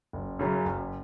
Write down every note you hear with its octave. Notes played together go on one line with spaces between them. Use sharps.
F#1
F#2 C#3 F#3 C#4
F#1